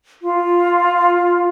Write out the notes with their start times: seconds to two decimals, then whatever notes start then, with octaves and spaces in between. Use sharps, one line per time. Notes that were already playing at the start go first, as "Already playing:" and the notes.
0.22 F4